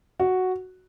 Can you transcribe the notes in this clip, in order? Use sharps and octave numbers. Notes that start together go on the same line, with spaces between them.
F#4